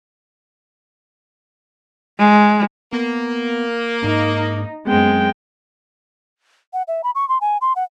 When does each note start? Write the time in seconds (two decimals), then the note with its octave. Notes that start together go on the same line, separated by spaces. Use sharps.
2.19 G#3
2.93 A#3 B3
4.04 G#2 D#4
4.87 F#2 G#3 B3 C4 G5
6.73 F#5
6.88 E5
7.04 B5
7.15 C#6
7.29 C6
7.41 G#5
7.61 C6
7.76 F#5